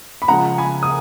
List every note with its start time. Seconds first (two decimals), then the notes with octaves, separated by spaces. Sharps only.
0.22 B5
0.28 C#2 C#3 F3 G#3 F#5 A#5
0.58 G#5 B5
0.83 D#6